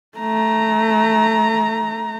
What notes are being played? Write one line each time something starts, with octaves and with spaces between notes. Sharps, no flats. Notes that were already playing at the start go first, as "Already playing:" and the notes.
A3 A#5